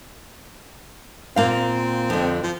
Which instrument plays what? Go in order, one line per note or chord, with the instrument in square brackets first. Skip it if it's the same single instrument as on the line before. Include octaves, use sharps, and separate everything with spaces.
[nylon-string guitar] A#2 A#3 F5 [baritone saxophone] C4
[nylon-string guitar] F2 D3
[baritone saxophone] F3